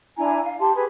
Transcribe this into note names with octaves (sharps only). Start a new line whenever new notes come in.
D4 E4 G#5 A#5
F5
G4 A5 C6
G4 G#4 B4